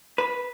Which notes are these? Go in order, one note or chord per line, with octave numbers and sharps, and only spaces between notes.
B4